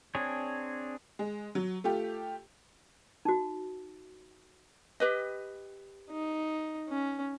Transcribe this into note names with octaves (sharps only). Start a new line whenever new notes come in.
C4 D4 G#4 C#5
G#3
F#3
A3 F4 G4
D#4 F#4
G4 B4 D#5
D#4
C#4